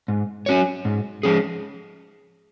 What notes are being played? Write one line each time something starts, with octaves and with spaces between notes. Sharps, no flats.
G#2
F#3 C#4 F#4 C#5
G#2
F3 G#3 C#4 G#4